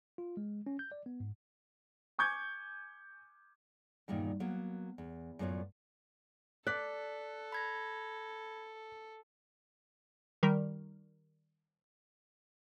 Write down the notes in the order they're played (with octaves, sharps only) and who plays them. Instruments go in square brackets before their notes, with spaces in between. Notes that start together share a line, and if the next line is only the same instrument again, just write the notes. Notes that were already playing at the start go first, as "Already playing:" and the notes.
[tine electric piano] F4
G#3
C#4
G6
D5
B3
G#2
[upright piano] G#5 C#6 D6 G6 G#6
[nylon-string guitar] E2 G2 A#2 D#3
F#3 A#3 B3
E2
F#2 A2 B3 F4 C#5 D5
[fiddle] A4 [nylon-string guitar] D5 [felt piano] F#6 B6
[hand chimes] B5 G#6 A#6
[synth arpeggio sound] D#3 G3 A#4